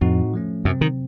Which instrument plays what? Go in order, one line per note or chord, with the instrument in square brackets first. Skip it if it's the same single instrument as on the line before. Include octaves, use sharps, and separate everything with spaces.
[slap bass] F2 [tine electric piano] A2 A3 C4 D#4 F#4
[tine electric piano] F3 A3 C#4
[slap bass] F#2 [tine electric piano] C3 F#3 C4
[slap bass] D#3